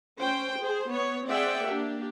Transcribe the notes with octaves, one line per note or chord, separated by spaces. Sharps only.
C#4 C5 G5
G#4 C5
B3 C#5
C4 G#4 D5 E5 F#5 G5
A#3 D4 G4